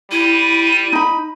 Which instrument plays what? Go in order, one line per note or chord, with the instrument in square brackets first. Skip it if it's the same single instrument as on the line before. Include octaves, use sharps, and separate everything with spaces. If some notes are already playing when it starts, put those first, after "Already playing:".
[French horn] G3 [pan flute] E4 [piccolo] D#7
[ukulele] D#4 B5